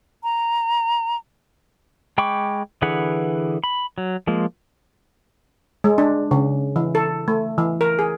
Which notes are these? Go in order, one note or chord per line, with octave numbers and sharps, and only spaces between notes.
A#5
G#3 G5 B5 C#6 D6
D3 E3 G#4 B4 F#5
B5
F#3
F3 G#3 A#3
G#3
D4
C#3
E3
A4
A3
E3
A#4
G#4